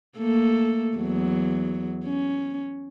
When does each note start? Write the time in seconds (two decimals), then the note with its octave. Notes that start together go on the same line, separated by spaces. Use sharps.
0.18 A3 A#3 A4
0.96 E2 F#3
2.05 C#4